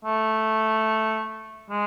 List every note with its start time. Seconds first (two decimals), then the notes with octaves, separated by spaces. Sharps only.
0.05 A3
1.70 G#3